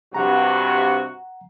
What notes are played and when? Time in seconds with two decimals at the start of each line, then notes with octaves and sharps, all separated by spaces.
0.14 G2 C3 F#4 F#5 A#5